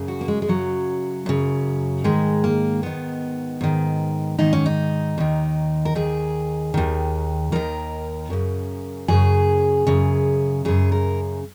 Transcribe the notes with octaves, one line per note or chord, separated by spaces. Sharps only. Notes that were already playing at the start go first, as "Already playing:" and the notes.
Already playing: F#2 C#3
F#4
A#3
G#3
G#3
F#2 C#3 F#3
F#2 C#3
G#2 D#3 G#3
A#3
G#2 D#3 B3
G#2 D#3
G#2 D#3 D#4
C#4
D#4
D#2 D#3
A#4
D#2 D#3 G#4
D#2 D#3
D#2 D#3 A#4
F#2 C#3
F#2 C#3 G#4
F#2 C#3
F#2 C#3 G#4
A#4